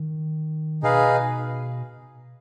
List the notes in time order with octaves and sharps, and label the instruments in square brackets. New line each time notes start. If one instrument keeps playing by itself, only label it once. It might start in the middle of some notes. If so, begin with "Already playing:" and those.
Already playing: [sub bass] D#3
[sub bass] B2 [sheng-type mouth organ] D#4 G#4 B4 F5